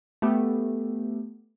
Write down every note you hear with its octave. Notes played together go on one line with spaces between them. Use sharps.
A3 B3 G4